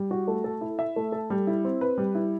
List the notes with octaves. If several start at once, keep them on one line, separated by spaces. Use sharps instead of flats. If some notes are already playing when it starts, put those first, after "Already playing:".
Already playing: G3
F#4
A3
A4
E4
E5
A3
A4
G3
E4
C4
B4
G3
E4